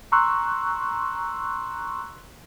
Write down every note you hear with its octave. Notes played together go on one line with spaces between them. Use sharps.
A#5 C6 C#6 E6 F#6